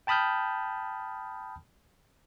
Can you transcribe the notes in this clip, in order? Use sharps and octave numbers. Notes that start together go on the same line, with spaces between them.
G5 A5 B5 D#6 F6 G6